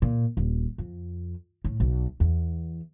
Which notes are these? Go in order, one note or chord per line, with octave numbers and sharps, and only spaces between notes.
A#2
D#1
F2
A2
B1
E2